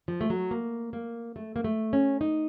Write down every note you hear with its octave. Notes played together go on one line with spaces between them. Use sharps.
F3
A3
F#3
A#3
A#3
A3
A#3
A3
C#4
D#4